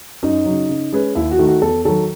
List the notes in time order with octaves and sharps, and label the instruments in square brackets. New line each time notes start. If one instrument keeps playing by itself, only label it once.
[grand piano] F#2 [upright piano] D#4
[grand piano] C#3 F#3
C#3
G#3 C#4 G#4 B4
[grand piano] D#2 [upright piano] E4
[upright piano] F#4
[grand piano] D#3 A3
[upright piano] F#4
[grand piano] E2 [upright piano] A4
[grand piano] D#3 F#3 [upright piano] A4